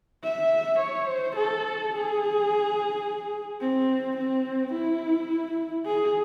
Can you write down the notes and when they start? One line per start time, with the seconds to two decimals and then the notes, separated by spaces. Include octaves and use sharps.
0.24 E5
0.79 C#5
1.07 C5
1.36 A4
1.93 G#4
3.61 C4
4.17 C4
4.72 E4
5.85 G#4